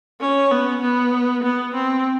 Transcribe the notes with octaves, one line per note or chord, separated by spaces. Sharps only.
C#4
B3
B3
B3
C4